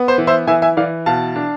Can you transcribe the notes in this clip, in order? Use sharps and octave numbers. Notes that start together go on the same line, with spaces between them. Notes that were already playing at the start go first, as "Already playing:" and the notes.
Already playing: B3
C5
E3
C5 E5
E3 E5 G#5
E5 G#5
E3 D5 F5
B2 F5 A5
D4